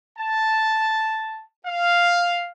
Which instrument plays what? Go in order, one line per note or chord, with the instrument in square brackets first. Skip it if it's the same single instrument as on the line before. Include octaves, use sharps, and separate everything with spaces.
[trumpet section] A5
F5